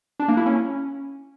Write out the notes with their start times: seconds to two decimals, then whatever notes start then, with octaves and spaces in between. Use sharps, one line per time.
0.20 D4
0.28 A#3
0.37 E4
0.46 C#4